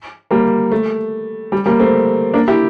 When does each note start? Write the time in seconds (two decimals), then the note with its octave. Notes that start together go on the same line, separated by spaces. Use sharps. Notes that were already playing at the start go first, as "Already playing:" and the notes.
0.31 G3 A#3
0.72 A3
1.52 G3
1.66 G3 A#3
1.80 A3 C4
2.34 A#3 D4
2.48 E4 G4